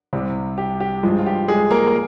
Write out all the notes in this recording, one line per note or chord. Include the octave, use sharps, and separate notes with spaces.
C2 C3 G3
G4
G4
G2 F3 G#3
F4
G4
G#3 G#4
A#3 A#4
A#4